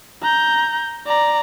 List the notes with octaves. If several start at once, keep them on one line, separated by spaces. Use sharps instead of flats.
A#5 G6
D5 A#5